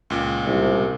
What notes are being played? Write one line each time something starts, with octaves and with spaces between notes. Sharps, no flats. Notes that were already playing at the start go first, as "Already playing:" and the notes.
C#2 A#2
C2